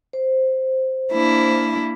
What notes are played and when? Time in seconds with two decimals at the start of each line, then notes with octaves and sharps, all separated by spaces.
0.13 C5
1.13 A#3 D4 E4